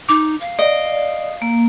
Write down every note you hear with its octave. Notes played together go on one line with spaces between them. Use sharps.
D#4 D6
F5
D5 D#5
A#3